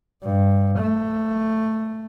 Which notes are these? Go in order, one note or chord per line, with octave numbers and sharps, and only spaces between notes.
G2
A3